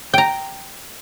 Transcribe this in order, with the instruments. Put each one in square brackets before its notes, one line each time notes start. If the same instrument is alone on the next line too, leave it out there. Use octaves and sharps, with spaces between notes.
[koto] G5 A#5